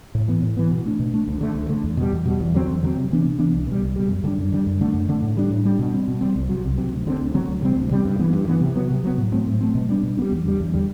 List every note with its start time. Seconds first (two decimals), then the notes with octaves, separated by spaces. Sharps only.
0.15 A2
0.28 E3 B3
0.42 A2
0.57 E3 B3
0.71 B2
0.85 A3 D4
1.00 B2
1.14 A3 D4
1.28 D2
1.41 D3 A3
1.55 D2
1.69 D3 A3
1.84 E2
1.97 B2 G3
2.12 E2
2.26 B2 G3
2.40 E2
2.54 D3 F#3 C4
2.68 E2
2.83 D3 F#3 C4
2.96 C3
3.11 E3 B3 D4
3.26 C3
3.39 E3 B3 D4
3.53 C2
3.67 B2 G3
3.82 C2
3.96 B2 G3
4.09 F#2
4.24 D3 G3 D4
4.38 F#2
4.52 D3 G3 D4
4.66 F#2
4.81 D3 A3 D4
4.94 F#2
5.09 D3 A3 D4
5.22 A2
5.37 G3 D4
5.50 A2
5.65 G3 D4
5.79 B2
5.94 G3 C4
6.08 B2
6.21 G3 C4
6.36 C2
6.49 C3 F#3
6.65 C2
6.78 C3 F#3
6.92 D2
7.07 D3 F#3
7.10 C4
7.20 D2
7.34 D3 F#3 C4
7.49 D2
7.62 C3 G3 C4
7.76 D2
7.91 C3 G3 C4
8.05 G2
8.19 E3 B3
8.33 G2
8.47 E3 B3
8.61 C3
8.76 F#3 B3
8.90 C3
9.04 F#3 B3
9.18 A2
9.32 F#3 A3 C4
9.47 A2
9.61 F#3 A3 C4
9.75 B2
9.89 G3 B3 D4
10.03 B2
10.17 G3 B3 D4
10.32 E2
10.45 D3 G3
10.60 E2
10.74 D3 G3